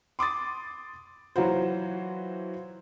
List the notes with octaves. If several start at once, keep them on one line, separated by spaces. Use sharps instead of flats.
C6 D6 D#6 A6
E3 F#3 F4 F#4 C5